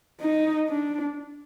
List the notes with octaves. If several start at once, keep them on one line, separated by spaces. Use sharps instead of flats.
D#4
D4